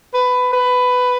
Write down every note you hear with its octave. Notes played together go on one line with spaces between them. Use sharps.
B4
B4